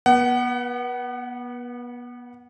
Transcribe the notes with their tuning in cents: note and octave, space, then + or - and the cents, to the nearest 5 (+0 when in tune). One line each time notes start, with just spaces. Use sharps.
B3 -30 F#5 +25